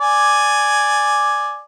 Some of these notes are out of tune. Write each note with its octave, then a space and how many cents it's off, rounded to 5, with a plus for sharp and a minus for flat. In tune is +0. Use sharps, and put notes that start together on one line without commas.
D5 +0 G#5 +0